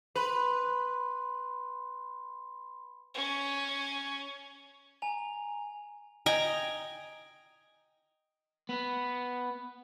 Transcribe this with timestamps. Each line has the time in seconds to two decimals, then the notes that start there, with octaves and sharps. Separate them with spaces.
0.16 B4 B5 C6
3.15 C#4
5.02 G#5 A#5 F7
6.26 D#5 G5 G#5 A#5
8.69 B3